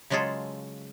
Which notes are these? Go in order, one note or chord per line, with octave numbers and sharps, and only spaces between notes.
C#3 F#3 G#3 F4 G#4 A4